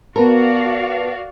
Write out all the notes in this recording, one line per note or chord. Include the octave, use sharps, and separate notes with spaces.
B3 F#4 A#4 B4 D5 F5 A5